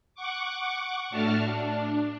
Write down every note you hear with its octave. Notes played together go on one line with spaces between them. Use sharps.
F#5 C#6 D6
A2 A3 D4 F#4 A5 F6
D4